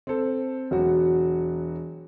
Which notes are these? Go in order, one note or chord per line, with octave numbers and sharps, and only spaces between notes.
C4 A4
E1 F#3 F#4